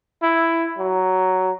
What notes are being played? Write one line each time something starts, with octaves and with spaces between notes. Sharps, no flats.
E4
F#3